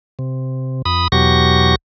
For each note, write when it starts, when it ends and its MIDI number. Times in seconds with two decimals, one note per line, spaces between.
0.19 0.82 48
0.85 1.08 41
0.85 1.08 83
0.85 1.08 87
1.12 1.75 40
1.12 1.75 47
1.12 1.75 54
1.12 1.75 67
1.12 1.75 85
1.12 1.75 94